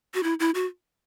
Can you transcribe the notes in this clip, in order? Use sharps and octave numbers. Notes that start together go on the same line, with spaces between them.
F#4
E4
E4
F#4